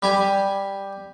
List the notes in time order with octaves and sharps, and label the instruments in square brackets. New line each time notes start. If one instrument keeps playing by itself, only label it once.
[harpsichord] G3 G4 G#5